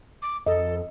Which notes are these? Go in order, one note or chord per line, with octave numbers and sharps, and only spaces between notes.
D6
F2 A4 D#5